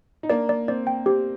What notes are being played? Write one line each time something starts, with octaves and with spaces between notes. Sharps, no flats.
D#4
A#3 D4 D5
D5
C4 D5
G5
C4 G4